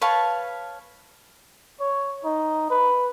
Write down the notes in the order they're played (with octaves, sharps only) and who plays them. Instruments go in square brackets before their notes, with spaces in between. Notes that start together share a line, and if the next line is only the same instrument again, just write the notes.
[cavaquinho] B4 C#5 F5 A5
[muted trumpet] C#5
D#4
B4